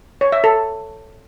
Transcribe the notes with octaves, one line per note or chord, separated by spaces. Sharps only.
C#5
E5
A4